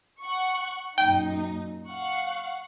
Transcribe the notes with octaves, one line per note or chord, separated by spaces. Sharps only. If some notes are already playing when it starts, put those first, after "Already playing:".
F#5 C#6
F#2 A#2 D#4 G5
F5 F#5 C#6